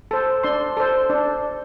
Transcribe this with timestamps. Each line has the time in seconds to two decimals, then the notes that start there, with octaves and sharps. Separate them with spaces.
0.11 A4 C5
0.43 D4 C6
0.77 A4 C5
1.10 D4